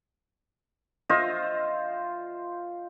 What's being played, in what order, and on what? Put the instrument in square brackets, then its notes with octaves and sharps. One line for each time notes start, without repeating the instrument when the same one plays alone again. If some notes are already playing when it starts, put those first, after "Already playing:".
[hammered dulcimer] F4 C5 D#5 E5